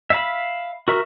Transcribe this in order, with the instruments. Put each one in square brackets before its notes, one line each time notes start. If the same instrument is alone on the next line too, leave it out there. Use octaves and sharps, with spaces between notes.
[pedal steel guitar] E5 F5 B5
F#4 A#4 E5